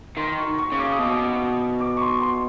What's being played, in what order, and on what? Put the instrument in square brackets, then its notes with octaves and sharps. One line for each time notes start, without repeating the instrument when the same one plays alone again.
[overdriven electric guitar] D#3 [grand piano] C6
[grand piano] C#6
C#6
[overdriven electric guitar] C#3
[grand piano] D6
D#6
[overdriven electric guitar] B2
[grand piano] D6
D6
C#6
C6
C6